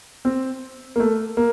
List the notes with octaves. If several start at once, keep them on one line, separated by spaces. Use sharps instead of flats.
C4
A#3
A3
A#3